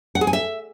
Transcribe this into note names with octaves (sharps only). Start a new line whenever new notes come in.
F#5
G#4
G#5
E5